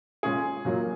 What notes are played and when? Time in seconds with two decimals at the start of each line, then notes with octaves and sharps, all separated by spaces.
0.23 A#2 G#3 C#4 G#4
0.65 A#2 F#3 A#3